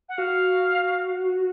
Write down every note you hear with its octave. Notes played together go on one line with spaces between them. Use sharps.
F#5
F#4 F5